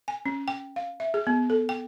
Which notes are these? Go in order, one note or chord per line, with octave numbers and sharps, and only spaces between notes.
G#5
C#4
G5
F5
E5
G#4
B3
A4
G5